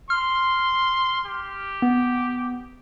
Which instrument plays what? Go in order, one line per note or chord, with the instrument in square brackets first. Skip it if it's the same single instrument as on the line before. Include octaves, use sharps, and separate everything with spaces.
[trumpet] C6 [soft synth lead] F6
[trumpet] G4
[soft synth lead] B3